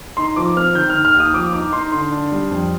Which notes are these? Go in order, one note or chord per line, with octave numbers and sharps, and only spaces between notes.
D#4 C6
F3 D6
C4 F6
D#3 G6
D#3 F6
F6
D#2
D#6
F3 D6
D#4 D6
D#4 C6
D3 C6
D4
G3
F2